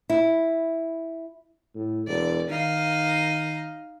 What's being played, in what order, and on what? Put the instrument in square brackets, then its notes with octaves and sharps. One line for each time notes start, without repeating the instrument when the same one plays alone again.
[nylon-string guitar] E4
[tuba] A2
[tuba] E1 [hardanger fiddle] D5
[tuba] D#3 [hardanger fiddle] D#4 F5